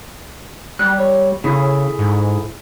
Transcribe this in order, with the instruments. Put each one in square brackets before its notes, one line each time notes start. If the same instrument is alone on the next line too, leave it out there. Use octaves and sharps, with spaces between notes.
[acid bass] G3 [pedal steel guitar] F#6
[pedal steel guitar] C#5
[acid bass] C#3 [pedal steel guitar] E4 G#4 A4
[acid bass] G#2